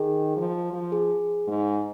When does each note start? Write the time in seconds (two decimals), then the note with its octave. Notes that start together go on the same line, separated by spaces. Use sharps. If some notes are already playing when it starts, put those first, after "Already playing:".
Already playing: D#3 G#4
0.37 F3
0.73 F3
0.92 G#4
1.48 G#2